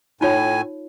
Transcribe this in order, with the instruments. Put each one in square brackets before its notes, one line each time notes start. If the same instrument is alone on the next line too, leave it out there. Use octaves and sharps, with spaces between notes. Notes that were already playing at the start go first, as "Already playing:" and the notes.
[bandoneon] A2 G#5 [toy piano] D#4 F4 C#5